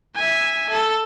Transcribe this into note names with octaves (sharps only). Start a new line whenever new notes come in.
E5 G#5
A4